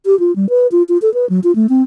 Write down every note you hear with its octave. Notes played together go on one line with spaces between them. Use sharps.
G4
F4
G3
B4
F4
F4
A4
B4
F#3
F4
A3
C4